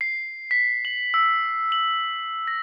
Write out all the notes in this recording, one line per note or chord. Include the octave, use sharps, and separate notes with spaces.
C7
B6
F#7
E6
F#7
A#6